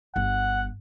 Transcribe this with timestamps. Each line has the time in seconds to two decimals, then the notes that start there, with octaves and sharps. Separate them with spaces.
0.16 G1 F#5